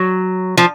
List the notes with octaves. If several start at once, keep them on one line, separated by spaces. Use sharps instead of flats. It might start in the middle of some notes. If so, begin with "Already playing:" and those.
Already playing: F#3
F3